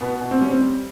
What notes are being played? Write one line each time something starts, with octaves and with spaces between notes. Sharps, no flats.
B2 B3
B2
C4
G3 C#4
C4
G3